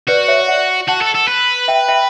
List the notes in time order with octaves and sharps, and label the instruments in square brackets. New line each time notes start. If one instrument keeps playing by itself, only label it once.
[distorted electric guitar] F#4 [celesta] B4 D5
[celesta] C#5 E5
D5 F#5
[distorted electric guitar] F#4 [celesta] F#5 A5
[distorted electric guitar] A4
A4
B4
[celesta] E5 G5
E5 G5